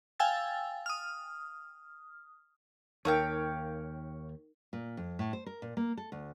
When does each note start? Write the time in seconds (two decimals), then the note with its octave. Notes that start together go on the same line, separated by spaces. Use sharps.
0.20 F5 G5 G#5 E6 A6
0.86 D#6 F6
3.05 D#2 D#4 A#4 C#5 F5 G5
4.73 A#2
4.97 F2
5.19 A2
5.33 C5
5.46 A#4
5.62 A#2
5.77 A#3
5.97 A4
6.12 D2